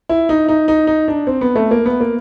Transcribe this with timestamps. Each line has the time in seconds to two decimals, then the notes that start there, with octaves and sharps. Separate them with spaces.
0.09 E4
0.29 D#4
0.48 D#4
0.68 D#4
0.87 D#4
1.08 D4
1.27 C4
1.41 B3
1.56 A3
1.71 A#3
1.86 B3
2.01 A#3